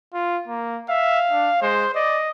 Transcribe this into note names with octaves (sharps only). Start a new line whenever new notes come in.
F4
A#3
E5 F5
D4
G#3 C5
D5 D#5